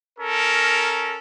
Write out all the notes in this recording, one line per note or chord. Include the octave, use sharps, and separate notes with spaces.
C#4 A4 A#4